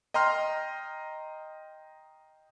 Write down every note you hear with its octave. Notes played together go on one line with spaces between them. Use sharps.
D#5 G5 A#5 C6 F6